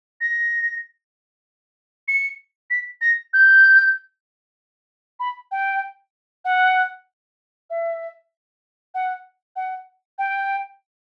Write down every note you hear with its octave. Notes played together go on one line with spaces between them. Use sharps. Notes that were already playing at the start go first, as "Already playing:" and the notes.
A#6
C#7
B6
A#6
G6
B5
G5
F#5
E5
F#5
F#5
G5